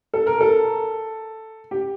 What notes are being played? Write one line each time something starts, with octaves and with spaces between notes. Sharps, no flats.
A4
A#4
A4
G4